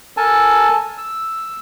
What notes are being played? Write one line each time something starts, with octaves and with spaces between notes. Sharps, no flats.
A4 A#4 G#5 A5
E6